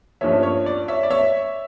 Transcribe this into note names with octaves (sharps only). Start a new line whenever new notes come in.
G2 F3 A#3 C#4 C#5 E5
C#5
D5
C#5 E5
D5
C#5 E5